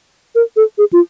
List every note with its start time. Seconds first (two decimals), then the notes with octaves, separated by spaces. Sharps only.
0.35 A#4
0.56 A4
0.78 G#4
0.93 F4